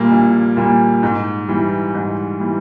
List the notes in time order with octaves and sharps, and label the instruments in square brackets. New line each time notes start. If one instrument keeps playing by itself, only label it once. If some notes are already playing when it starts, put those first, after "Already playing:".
Already playing: [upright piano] A#1 A#2 G3 A#3
A#1
A#2 G3 A#3
G#2
E3 G3
G#2
E3 G3